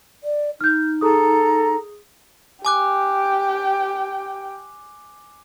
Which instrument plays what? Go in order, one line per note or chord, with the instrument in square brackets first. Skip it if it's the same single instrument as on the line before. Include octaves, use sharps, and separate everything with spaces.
[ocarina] D5
[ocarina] D#4 [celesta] F6 G6
[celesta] G#4 D#6 [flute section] A4 A#5
[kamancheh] G4 G5 [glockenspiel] G#5 D6 F#6